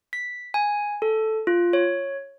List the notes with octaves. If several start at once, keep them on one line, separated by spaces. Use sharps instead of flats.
B6
G#5
A4
F4
C#5